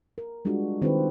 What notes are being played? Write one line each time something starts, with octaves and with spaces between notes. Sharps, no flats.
A#4
G3 G#3 D4 F4 F#4
D#3 C4 F4 G4 A4 B4